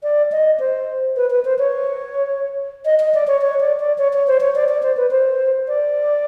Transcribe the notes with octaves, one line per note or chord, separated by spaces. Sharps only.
D5
D#5
C5
B4
B4
C5
C#5
D#5
D#5
D5
C#5
C#5
D5
D5
C#5
C#5
C5
C#5
D5
D5
C5
B4
C5
D5